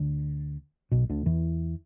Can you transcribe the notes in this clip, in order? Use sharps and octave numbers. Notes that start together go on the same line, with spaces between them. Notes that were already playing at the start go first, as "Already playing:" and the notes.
Already playing: D2 D3
B1 B2
D2 D3
E2 E3